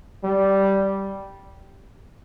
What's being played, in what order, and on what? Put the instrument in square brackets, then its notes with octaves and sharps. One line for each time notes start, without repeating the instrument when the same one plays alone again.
[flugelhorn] G3